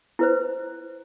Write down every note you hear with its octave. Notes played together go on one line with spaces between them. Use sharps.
E4 B4 C5